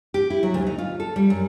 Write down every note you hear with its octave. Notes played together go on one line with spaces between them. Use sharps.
G4
E4
F#3
D2
D#4
F4
A4
G3
F#2